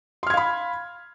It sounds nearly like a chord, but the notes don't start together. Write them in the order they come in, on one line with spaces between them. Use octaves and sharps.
C6 F6 G#6 F5 B5